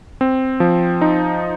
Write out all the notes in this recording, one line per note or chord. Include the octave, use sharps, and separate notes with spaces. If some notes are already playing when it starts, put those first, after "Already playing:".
C4
F3
D#4